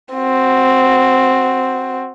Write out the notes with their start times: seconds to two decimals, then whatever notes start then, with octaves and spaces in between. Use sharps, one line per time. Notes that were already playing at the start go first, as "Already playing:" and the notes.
0.14 C4 F#4